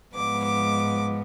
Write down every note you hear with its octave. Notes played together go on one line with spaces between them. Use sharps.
G#2 F3 G#3 B3 D6
D6